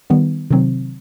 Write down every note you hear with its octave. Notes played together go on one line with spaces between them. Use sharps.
D#3 G3 B3
C3 D#3 F#3 C4